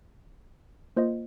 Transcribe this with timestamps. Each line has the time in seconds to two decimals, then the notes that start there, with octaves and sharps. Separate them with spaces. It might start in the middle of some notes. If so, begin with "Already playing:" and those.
0.96 A#3 F4 C5 D#5